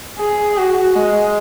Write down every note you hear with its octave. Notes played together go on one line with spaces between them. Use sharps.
G#4
F#4
G#3